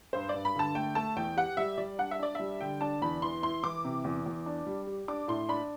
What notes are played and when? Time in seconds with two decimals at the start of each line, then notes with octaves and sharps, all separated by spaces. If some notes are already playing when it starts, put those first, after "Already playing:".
0.13 G2 C5
0.29 D5
0.34 G2
0.45 B5
0.55 D3 A5
0.75 A3 G5
0.95 A3 A5
1.16 E2 G5
1.36 G4 F#5
1.57 G3 E5
1.78 G3 D5
1.98 D4 F#5
2.11 E5
2.19 D4 D5
2.35 G3 E5
2.61 D3 G5
2.81 D4 A5
3.02 E2 B5
3.22 E3 C6
3.42 E4 C6
3.63 E3 D6
3.84 C3
4.04 E2
4.26 E2
4.46 D4
4.67 G3
4.87 G4
5.08 D4 D6
5.28 A2 C6
5.49 D4 B5